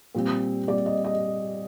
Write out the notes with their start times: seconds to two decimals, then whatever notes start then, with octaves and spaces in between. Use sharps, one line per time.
0.15 A#2 G3 C4
0.68 A#2 G3 C4 D5
0.86 D#5
1.04 D#5